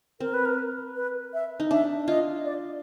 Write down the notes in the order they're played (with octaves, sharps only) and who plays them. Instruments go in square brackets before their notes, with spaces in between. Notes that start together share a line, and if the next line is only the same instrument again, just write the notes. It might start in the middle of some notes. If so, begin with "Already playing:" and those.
[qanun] C4 [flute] A#4
[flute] B4
A#4
B4
E5
[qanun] D#4
[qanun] D4 [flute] E5
[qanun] F4 [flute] D#5
[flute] D5